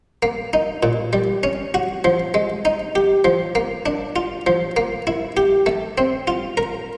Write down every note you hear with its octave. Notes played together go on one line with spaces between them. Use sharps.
A#3
D#4
A#2
G3
C#4
F#4
F3
G#3
D#4
G4
F3
A#3
D4
F4
F3
A#3
E4
G4
A3
C4
F4
A#4